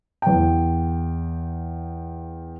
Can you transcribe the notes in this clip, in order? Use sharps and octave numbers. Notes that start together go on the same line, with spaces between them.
E2 G5